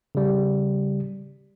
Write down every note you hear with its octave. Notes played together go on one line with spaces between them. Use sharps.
C#3 G3